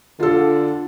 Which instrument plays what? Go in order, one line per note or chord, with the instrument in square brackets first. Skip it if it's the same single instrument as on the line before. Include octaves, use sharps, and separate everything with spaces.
[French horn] D3 [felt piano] F4 A4